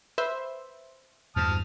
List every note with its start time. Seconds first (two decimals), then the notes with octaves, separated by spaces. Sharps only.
0.18 B4 C5 E5
1.36 E2 G2 A5 D#6 F6